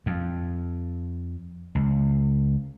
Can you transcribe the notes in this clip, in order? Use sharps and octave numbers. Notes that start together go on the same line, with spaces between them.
F2
C#2